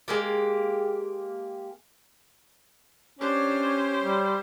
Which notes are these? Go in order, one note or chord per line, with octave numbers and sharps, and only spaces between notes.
G#3 A#3 G4
C#4 D4 G4 C5 C#5
G3